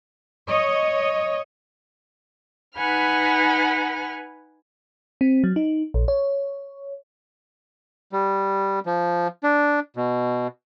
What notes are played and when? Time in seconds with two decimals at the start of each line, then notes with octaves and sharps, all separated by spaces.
0.47 C#5 D#5
2.76 D#4 B4 F#5 G#5 B5 F6
5.21 C4
5.44 F#3
5.56 D#4
5.94 A#1
6.08 C#5
8.12 G3
8.86 F3
9.43 D4
9.96 B2